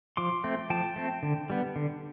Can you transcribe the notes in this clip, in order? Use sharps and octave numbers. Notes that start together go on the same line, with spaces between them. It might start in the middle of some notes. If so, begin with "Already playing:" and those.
F3 C6 D6
A3 C4
F3 G5 A5
A3 C4
D3
G3 B3
D3